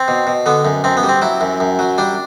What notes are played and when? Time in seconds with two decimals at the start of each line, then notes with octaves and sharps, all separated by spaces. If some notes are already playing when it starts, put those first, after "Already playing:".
Already playing: C4
0.08 B2
0.27 B2
0.46 D3 B3
0.65 F#2
0.84 F#2 C4
0.97 B3
1.03 G3
1.09 C4
1.22 F#3 E4
1.41 F#2
1.60 F#2
1.79 F#3
1.98 G3 D4